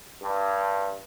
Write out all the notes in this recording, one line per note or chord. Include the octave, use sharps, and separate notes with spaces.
G2